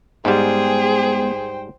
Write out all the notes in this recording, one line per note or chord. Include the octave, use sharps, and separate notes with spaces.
G#2 G3 G#3 B3 G#4 C5 G5